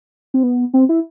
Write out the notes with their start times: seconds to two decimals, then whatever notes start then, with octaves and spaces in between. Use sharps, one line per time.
0.34 C4
0.43 B3
0.74 C4
0.89 E4